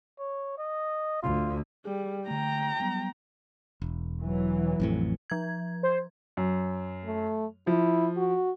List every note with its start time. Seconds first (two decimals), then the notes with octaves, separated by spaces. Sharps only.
0.19 C#5
0.58 D#5
1.23 D2 F4
1.85 G3 G#4
2.28 D3 A3 G5 A#5
2.80 F#3 G3 B3
3.82 E1
4.21 E3 F#3
4.80 A1 F2 A2
5.30 F3 G#6
5.83 C5
6.37 F#2
7.05 A3
7.67 F3 E4
8.17 F#4